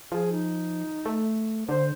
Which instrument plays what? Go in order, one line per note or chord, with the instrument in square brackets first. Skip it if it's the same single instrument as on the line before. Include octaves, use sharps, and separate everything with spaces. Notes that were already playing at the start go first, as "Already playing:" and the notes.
[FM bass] F3 [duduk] G#4
[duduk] D#4
[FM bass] A3
[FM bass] D3 [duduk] C5